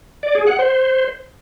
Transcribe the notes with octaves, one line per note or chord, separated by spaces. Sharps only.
D5
G#4
F#5
C5